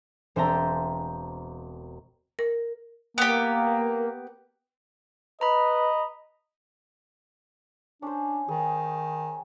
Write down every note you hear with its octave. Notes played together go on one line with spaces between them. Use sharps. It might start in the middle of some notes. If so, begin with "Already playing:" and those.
E1 C4 E5 G5 A5 A#5
A#4
A#3 B3 G4
B4 D#5 A#5 B5
C#4 D4 C5
D#3 G#4